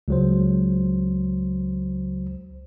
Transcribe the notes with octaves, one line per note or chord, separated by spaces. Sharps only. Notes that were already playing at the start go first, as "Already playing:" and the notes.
C#2 F#3 C5